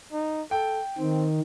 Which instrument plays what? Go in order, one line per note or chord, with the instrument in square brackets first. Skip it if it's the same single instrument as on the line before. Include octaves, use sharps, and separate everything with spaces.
[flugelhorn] D#4
[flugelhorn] A4 [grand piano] G5
[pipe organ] D#3 [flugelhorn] C4